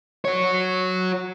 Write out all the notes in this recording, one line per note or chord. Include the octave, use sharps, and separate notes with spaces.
F#4 C#5